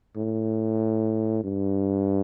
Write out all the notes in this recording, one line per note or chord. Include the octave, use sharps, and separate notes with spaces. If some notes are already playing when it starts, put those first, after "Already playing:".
A2
G2